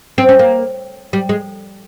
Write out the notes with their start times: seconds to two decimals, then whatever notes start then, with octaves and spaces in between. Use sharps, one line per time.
0.18 C4
0.29 C#4
0.39 A#3
1.13 G3
1.29 G#3